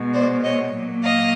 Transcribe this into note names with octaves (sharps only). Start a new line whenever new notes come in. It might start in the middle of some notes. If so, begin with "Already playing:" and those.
Already playing: B2 G#3
C5 D5
C#5 D#5
A#2 F#3 A#3
D#5 F5